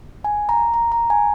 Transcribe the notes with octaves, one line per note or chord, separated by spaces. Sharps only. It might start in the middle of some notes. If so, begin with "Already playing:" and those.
G#5
A#5
A#5
A#5
G#5